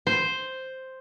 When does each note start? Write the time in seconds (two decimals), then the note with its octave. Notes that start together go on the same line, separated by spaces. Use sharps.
0.07 C5